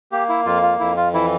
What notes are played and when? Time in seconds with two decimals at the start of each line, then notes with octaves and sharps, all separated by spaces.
0.12 A#3 G4
0.29 E4
0.45 F2 F4
0.62 F4
0.80 F2 E4
0.97 F4
1.14 E3 E4